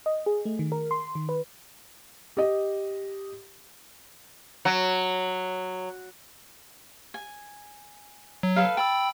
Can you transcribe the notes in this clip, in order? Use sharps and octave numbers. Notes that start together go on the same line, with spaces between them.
D#5
G#4
A3
D#3
A#4
C6
D#3
B4
G4 D#5
F#3
G#5
F#3
A4 B4 F5
G5 A5 B5 E6